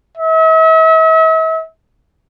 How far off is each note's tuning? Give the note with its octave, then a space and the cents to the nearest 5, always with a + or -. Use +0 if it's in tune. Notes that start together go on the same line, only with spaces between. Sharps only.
E5 -45